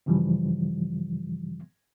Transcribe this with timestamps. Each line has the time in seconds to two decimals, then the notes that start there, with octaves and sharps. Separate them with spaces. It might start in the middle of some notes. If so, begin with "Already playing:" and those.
0.06 G2 C#3 E3 F3 G3